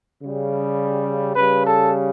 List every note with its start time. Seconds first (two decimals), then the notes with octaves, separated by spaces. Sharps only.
0.22 C#3 G3
1.36 C#3 G3 B4
1.65 A4